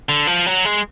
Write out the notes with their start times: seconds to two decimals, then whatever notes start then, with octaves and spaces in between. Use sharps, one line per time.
0.09 D3
0.27 F3
0.46 F#3
0.65 G#3